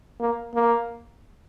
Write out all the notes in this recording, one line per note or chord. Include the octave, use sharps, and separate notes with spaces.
A#3
A#3